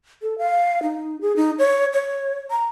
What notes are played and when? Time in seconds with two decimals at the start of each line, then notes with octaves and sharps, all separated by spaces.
0.22 A4
0.38 F5
0.83 D#4
1.21 G#4
1.36 D#4
1.59 C#5
1.93 C#5
2.51 A#5